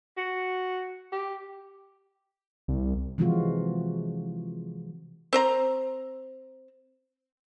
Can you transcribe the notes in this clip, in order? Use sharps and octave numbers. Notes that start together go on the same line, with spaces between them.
F#4
G4
C2
C3 E3 F3 G#3 F4 F#4
C4 C5 A#5